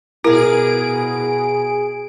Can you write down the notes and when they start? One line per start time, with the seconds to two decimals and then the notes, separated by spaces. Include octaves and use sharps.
0.24 B2 E4 G#4 A#4 F5 D7